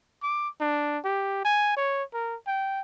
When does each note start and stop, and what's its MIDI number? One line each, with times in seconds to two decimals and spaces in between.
0.23 0.49 86
0.60 0.98 62
1.04 1.41 67
1.44 1.76 80
1.77 2.03 73
2.14 2.36 70
2.47 2.82 79